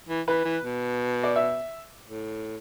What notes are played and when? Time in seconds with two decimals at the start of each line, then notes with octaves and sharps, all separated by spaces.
0.09 E3
0.28 E3 B4
0.45 E3
0.64 B2
1.23 D5
1.35 E5
2.07 A2